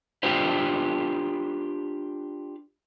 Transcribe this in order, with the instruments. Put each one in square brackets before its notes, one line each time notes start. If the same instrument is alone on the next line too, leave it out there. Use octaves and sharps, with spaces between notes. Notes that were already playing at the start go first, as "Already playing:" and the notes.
[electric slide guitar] D4 F4 G4 B4 C5